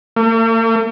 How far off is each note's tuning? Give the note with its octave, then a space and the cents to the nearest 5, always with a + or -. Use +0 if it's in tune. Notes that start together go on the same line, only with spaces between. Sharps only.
A#3 -45